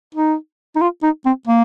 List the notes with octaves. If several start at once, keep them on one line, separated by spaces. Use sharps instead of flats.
D#4
D#4
F4
D#4
C4
A#3